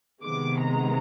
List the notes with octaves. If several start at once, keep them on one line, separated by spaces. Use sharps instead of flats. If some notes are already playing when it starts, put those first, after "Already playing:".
C3 D#3 G#3 B3 D6
A#5